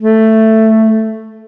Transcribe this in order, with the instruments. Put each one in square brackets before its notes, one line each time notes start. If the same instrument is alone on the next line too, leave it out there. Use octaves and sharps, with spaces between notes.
[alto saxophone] A3